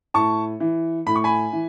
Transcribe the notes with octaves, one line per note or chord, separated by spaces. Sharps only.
A2 A5 C#6
E3
A2 B5
C#6
G#5 B5
E3